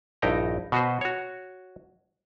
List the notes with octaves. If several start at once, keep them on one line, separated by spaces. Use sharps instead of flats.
A#1 G2 D#4 E4 G5 A#5
B2 F#4 B4 C5
F#4 C#5